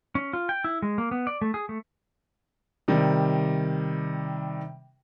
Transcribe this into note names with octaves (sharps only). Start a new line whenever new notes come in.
C#4
F4
G5
E4
G#3
A#3
B3
D5
A3
G#4
A3
C3 D#3 G3